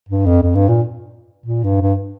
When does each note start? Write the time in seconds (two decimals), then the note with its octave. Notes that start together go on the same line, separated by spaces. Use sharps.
0.09 G2
0.26 F2
0.42 F2
0.55 G2
0.68 A#2
1.46 A#2
1.64 G2
1.81 G2